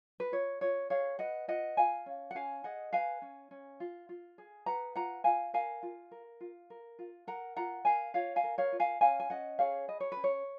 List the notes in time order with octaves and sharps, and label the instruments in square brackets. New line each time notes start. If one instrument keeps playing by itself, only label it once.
[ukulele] B4
F4 C#5
F4 C#5
G#4 C#5 F5
B4 D#5 F#5
F4 D#5 F#5
F4 F5 G#5
C#4
F#5
C#4 F5 G#5
G#4 D#5 F#5
B4 F5 G#5
C#4
C#4
F4
F4
G#4
B4 F#5 A#5
F4 F#5 A#5
F4 F5 G#5
A#4 F5 G#5
F4
A#4
F4
A#4
F4
A#4 F#5 A#5
F4 F#5 A#5
A#4 F5 G#5
F4 C#5 F5
F5 G#5
A#4
C#5 F5
F4
F5 G#5
C#4 F5 G#5
G#5
C#4 D#5 F#5
G#4 C#5 F5
B4 D#5
C#5
C#4 B4
C#5